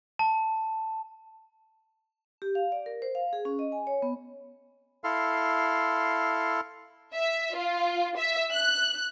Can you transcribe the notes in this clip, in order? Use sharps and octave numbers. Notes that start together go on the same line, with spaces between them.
A5
G4
F5
D5
A#4
C5
F5
G#4
C#4
D#5
G#5
C#5
B3
E4 A4 F5 C6
E5
F4
E5
F#6